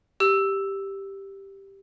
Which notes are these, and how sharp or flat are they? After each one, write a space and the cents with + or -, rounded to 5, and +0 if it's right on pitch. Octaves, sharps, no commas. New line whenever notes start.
G4 +0 E6 +0